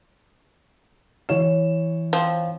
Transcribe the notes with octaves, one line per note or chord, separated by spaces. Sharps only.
E3 C#5 E7
F3 C4